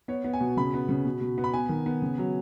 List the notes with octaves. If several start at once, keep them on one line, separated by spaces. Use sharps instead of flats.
B3 C#5
B3
G#5
B2
C#3 B5
B3
C#3
B2
B2
B3
B5
B3 G#5
D#3
B3
C#3
F#3